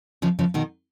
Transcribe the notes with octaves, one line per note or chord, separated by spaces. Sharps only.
C#3 F3
C#3 F3
B2 D#3